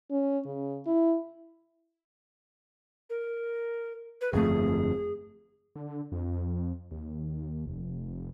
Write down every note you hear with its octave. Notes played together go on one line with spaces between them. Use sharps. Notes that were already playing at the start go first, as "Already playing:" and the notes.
C#4
C#3
E4
A#4
B4
G1 F2 A3 G#4
D3
F2
D#2
F1